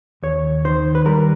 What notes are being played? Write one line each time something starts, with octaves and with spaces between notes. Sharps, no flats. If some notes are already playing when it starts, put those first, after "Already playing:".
D#2 C#5
D#3 C5
B4
G3 A#4